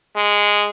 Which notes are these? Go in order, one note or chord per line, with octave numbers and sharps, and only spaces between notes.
G#3